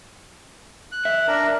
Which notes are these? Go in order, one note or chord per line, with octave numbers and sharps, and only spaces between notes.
F#6
E5
D4 A#4